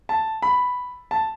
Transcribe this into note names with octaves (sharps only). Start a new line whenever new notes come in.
A5
B5
A5